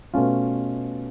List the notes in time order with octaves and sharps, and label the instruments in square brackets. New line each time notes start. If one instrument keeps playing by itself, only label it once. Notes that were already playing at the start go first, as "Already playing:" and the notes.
[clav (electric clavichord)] B2 A3 C#4 F4